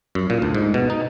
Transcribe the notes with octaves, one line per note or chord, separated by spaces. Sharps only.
F#2
A#2
D2
G#2
B2
D#4